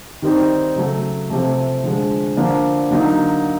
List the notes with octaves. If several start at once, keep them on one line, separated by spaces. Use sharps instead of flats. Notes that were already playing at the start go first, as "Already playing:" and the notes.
D#3 G3 C4 D#4
C#3 F#3 A3
C3 F3 A3
D3 F3 G#3
D3 F3 A#3 D4
D3 F#3 A#3 D#4